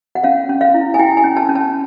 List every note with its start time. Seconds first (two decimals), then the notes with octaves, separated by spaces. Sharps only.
0.15 F#5
0.24 C#4 F5
0.49 C#4
0.61 F5
0.74 E4
0.94 G#5
0.99 E4 G5
1.17 G#5
1.24 C#4
1.37 A5
1.49 C#4
1.55 A5